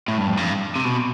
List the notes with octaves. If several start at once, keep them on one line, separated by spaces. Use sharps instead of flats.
A2
G2
F2
G2
C3
B2